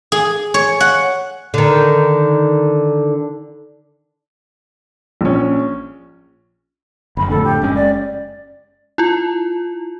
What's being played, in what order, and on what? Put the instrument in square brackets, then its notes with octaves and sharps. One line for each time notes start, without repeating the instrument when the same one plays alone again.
[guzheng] G#4
C#5
F#5
[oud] D3 D#3
[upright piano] A#1 C#4
[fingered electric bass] F#1 F#2 [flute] B5
[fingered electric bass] F2 A2 D3 [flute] A4
[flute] G4
[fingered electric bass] F#1 G#3 C#4
[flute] D5
[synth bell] E4 F4